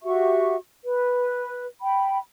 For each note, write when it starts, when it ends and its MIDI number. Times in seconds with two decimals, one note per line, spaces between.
0.03 0.55 66
0.03 0.55 67
0.03 0.55 76
0.03 0.55 85
0.84 1.67 71
1.82 2.18 79
1.82 2.18 83